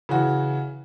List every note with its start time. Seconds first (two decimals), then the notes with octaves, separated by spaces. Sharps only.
0.09 C#3 E3 F#4